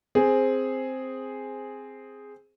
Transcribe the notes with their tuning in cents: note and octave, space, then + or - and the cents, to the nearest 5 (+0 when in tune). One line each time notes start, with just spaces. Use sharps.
C4 +0 G#4 +0 C5 +5